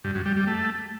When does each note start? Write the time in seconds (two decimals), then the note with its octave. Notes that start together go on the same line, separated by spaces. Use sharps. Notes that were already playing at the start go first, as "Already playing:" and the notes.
0.04 G2
0.15 F#2
0.26 G3
0.36 G3
0.47 A3